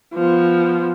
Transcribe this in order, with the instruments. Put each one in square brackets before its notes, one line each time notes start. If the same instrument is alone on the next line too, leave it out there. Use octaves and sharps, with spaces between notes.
[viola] F3 B3